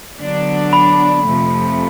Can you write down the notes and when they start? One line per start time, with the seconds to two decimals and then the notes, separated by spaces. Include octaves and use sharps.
0.19 D3 F#3 B3 D4
0.73 B5
1.26 F2 C3 F3 A3